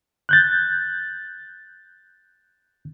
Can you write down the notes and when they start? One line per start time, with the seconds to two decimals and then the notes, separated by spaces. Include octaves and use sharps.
0.29 F#6 G6 A6